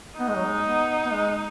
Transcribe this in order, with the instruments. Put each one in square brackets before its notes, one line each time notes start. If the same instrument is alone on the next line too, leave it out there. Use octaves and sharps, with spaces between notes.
[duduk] B3 [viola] D#4
[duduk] G#3
F#3
G#3
B3
B3
G#3